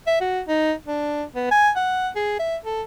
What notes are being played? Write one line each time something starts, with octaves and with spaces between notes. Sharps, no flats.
E5
F#4
D#4
D4
B3
G#5
F#5
G#4
E5
A4